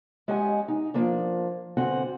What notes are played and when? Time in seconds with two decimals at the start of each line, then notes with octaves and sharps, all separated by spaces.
0.28 G#3 C#4 G4 D#5 F#5 G#5
0.68 D#4
0.94 F3 A#3 D4
1.77 G2 D3 C4 F#4 F#5 G#5